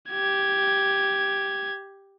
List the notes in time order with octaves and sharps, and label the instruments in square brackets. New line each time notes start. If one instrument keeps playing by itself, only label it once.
[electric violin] G4 G#6